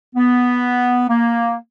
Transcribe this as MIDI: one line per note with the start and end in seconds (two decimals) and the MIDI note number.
0.15 1.04 59
1.09 1.56 58